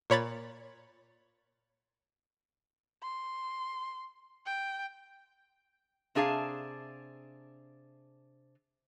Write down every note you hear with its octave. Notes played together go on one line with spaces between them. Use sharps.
A#2 C#5 B5 A6
C6
G5
C3 D4 G#4 F5 A5